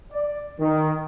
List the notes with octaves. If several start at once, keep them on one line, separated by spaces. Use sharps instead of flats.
D5
D#3